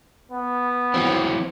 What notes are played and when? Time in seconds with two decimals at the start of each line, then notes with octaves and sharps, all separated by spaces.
0.32 B3
0.94 E3 F#3 C4